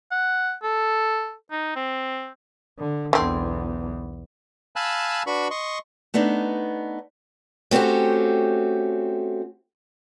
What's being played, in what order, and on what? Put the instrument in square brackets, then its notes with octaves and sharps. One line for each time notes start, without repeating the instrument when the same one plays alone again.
[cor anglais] F#5
A4
D#4
C4
[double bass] D3
[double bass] B1 E2 [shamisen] D3 C4
[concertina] F5 G#5 A5 B5 E6 F#6
D4 F#4 B4 B5 C#6
D#5 C6 C#6
[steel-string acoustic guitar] A3 B3 D4 D#4
A3 C4 C#4 F#4 G4